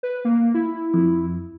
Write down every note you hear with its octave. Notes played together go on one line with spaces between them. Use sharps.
B4
A#3
E4
F2